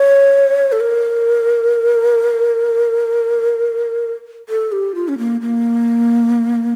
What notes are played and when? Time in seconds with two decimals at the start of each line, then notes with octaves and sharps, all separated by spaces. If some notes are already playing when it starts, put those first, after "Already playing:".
Already playing: C#5
0.72 A4
0.80 A#4
4.49 A4
4.72 G4
4.95 F4
5.08 C#4
5.18 A#3
5.41 A#3